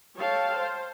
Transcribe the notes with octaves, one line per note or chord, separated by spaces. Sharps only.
A4 C#5 F5 G5 A5
C5